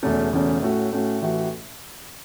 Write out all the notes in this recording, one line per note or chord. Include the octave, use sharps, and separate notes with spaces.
E1 E2 C#3 A3 C#4
E1 E2 C#3 A3 C#4
A2 A3 C#4 F#4
A2 A3 C#4 F#4
A1 A2 E3 A3 F#4